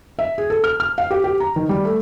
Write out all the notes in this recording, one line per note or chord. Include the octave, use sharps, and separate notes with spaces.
E5
G#4
A4
F6
F6
F5
G4
G4
A#5
D#3
G3
A3